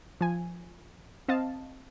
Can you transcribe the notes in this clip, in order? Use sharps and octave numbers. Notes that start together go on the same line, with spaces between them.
F3 G#5
C4 D#5 F5 A5